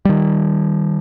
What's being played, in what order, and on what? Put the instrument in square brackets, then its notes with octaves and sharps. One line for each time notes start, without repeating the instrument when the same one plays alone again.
[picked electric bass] D#3 G3